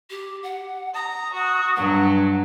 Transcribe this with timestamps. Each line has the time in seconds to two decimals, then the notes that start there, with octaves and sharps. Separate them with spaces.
0.10 G4
0.43 F#5
0.94 A#5 D#6
1.32 F#4
1.75 G2 F#3 F#5